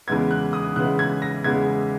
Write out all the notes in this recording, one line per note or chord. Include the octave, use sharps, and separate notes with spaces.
E2 C#3 G#3 B3 G#6
F#6
D#6
E2 C#3 G#3 B3 F#6
G#6
A#6
E2 C#3 G#3 B3 G#6